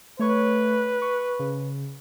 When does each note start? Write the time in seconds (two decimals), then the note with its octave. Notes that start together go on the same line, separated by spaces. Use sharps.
0.19 A3 B4 C#5 C#6
1.02 C#6
1.39 C#3